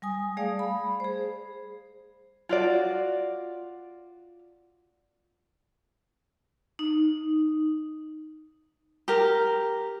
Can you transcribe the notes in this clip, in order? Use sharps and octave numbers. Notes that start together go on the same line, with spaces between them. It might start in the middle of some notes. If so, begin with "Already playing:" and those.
G3 G#5 D#6
G3 A3 G#4 D5 F5
B5
G#4 C5
F4 F#4 D5
D#4
G4 A#4